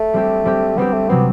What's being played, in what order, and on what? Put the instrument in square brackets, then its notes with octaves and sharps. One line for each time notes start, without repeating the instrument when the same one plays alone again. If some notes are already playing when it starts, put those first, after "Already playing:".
Already playing: [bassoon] A3
[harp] G3 C4 G4
G3 C4 G4
[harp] G3 C4 G4 [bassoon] B3
[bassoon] A3
[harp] C3 F#3 C4 [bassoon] B3